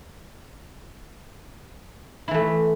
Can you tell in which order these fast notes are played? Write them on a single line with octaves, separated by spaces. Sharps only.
E4 E3 A3